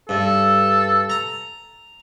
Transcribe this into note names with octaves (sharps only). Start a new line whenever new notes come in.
G2 A4
A#5